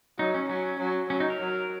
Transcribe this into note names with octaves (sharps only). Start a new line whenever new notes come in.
F#3 D#4
C#4
F#3 C#4
F#3
F#3 C#4
D#4
A#4
F#3